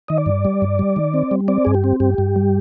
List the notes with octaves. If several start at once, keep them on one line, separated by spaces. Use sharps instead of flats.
D#3 D#5
D5
G2
G3
G2
G3
D#3
C4
G3
C4 D5
G2 G#4
G4
C4
G2 G4
G2
G3